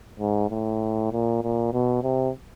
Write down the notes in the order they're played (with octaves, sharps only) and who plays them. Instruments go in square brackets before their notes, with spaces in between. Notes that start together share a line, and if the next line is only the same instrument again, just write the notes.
[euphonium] G#2
A2
A#2
A#2
B2
C3